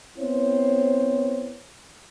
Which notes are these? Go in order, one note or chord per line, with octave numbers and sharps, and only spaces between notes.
B3 C4 E4 C5 C#5